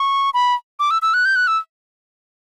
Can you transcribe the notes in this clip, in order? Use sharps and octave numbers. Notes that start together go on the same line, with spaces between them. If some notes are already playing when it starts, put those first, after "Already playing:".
Already playing: C#6
B5
D6
E6
E6
F#6
G6
F#6
E6